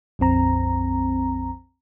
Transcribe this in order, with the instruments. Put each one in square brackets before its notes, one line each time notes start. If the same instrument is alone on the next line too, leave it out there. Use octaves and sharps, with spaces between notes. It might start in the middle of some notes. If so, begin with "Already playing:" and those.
[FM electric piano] A#1 F2 C4 A#5